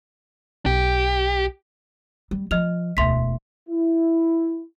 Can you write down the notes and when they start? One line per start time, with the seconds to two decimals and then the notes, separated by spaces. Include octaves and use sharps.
0.66 B1 G4
2.31 G3
2.51 F3 D#5 F6 F7
2.97 E1 D2 E5 C6 B6
3.69 E4